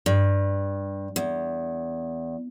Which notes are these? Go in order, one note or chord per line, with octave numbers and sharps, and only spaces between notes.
G2
E2